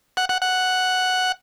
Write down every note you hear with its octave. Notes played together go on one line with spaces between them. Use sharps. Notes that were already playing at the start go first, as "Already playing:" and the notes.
F#5
F#5
F#5